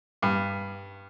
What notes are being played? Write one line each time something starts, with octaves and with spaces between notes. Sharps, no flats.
G2